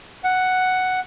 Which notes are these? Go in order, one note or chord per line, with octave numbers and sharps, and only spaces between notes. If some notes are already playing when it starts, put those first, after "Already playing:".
F#5